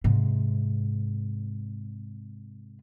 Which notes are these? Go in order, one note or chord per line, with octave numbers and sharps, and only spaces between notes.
G#2 C3